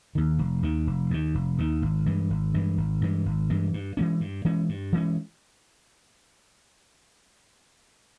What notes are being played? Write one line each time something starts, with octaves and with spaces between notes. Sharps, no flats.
D#2 D#3
F1
D#2 D#3
F1
D#2 D#3
F1
D#2 D#3
G#1
G2 E3 G#3
G#1
G2 E3 G#3
G#1
G2 E3 G#3
G#1
G2 E3 G#3
G2
E3 G#3 C#4
G2
E3 G#3 C#4
G2
E3 G#3 C#4